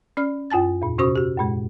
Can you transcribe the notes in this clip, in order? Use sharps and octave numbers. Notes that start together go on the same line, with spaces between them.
C#4 D5 F6
F#2 F4 G#5 A5 A6
E2 A#2
C3 C#4 F#4 C5 C#6 D#6
F#4 G4
F#2 A#2 G#3